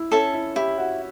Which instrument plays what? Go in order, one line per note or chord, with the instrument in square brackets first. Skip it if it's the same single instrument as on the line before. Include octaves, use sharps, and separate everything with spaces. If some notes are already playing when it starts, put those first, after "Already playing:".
Already playing: [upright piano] E4
[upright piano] C#4 [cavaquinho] A4 E5 A5
[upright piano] E4
[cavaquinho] E4 [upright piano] G4
[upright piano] F#4